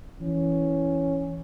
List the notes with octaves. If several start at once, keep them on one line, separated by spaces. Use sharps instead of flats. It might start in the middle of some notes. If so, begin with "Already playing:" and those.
E3 C#4